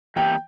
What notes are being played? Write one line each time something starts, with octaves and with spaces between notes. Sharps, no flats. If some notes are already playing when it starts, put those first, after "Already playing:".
E2 E3 A#3 G4 G5